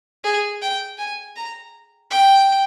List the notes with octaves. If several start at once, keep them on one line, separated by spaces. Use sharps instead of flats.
G#4
G5
G#5
A#5
G5